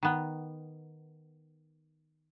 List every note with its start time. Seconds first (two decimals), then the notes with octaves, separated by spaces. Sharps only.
0.03 D#3 B3